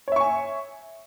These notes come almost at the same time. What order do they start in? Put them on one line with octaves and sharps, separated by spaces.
C#5 E5 C#6 G#5